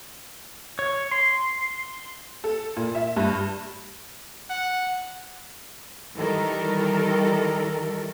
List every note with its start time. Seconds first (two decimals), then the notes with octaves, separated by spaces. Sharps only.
0.79 C#5
1.11 C6
2.44 A4
2.77 A#2
2.95 E5
3.16 G2
4.50 F#5
6.16 D#3 E3 G3 A4 A#4